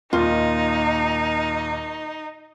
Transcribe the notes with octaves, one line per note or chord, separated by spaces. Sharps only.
D#2 A#2 D#4 F4